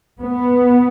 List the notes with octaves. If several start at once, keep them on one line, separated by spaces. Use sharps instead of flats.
B3